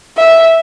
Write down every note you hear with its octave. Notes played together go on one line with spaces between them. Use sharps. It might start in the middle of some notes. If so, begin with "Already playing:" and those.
E5